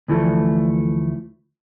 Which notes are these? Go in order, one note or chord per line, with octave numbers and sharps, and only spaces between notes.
D2 E3 F3 A3